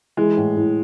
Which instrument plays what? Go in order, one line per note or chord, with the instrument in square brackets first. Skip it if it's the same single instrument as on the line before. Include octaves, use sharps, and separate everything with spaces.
[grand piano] E3 [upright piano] G#3
[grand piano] A2
A2